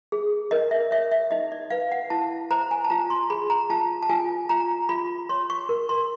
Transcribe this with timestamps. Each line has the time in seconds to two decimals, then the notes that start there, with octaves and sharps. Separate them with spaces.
0.12 G#4
0.51 A#4 D#5
0.71 E5
0.91 C#5 E5
1.11 E5
1.31 D#4 D#5
1.52 D5
1.70 B4 F5
1.92 F#5
2.10 E4 A5
2.51 C5 A#5
2.71 G#5
2.85 A5
2.90 F4 A#5
3.10 C6
3.30 G#4 B5
3.50 A#5
3.70 F4 A5
4.02 A5
4.09 F4 G#5
4.49 F4 A#5
4.89 F4 B5
5.29 C#5 C6
5.50 C#6
5.69 A#4
5.89 C6